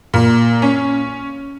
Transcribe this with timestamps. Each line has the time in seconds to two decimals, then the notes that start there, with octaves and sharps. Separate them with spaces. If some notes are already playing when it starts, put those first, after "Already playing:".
0.14 A#2
0.62 C#4